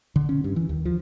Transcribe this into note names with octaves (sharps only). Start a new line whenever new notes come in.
D3
C#4
G2
E3
D#2
F3